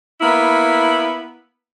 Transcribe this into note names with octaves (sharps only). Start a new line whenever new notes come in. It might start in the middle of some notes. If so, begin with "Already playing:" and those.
A#3 B3 E4